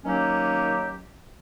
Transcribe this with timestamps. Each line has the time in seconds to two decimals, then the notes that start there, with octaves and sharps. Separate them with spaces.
0.05 D#3 F#3 A#3 C#4 G4